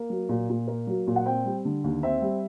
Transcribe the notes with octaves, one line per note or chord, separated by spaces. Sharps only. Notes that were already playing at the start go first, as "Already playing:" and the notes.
Already playing: A#3
F#3
A#2
A#2
A#3
F#3
A#2
F#5
C4 G5
G3
D3
D#2
C4 E5
G3